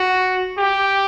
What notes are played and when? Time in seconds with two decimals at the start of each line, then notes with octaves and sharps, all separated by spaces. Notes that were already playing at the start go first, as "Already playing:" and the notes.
Already playing: F#4
0.58 G4